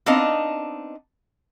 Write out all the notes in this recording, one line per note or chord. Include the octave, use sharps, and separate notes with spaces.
B3 C4 D4 D#4 D#5 F5